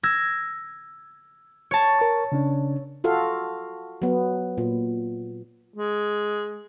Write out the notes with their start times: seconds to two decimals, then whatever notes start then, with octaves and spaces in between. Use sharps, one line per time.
0.03 E6 G#6 A#6
1.71 C#5 A5
1.99 A#4 C#6
2.32 C#3 C#4 D4
3.04 F4 F#4 A4 F5
4.02 F#3 B3
4.58 A#2
5.76 G#3